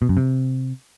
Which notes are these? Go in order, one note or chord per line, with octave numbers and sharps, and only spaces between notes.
B2
F#2
C3